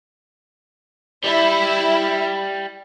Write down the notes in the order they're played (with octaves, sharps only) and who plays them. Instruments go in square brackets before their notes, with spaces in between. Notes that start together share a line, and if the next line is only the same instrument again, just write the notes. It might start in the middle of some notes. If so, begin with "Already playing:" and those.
[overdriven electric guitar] G3 [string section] E4